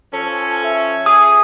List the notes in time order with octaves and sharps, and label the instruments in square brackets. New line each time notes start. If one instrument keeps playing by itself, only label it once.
[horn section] F3 C#4 [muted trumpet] A4
[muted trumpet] E5
[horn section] G#4 [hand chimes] D#6